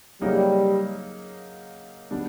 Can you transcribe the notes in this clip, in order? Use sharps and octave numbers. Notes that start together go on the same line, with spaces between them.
C#3 F#3 G3 A#3 D#4
D#3 G3 B3 D4